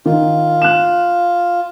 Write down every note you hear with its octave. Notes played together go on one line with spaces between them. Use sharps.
D#3 F4
F#6 E7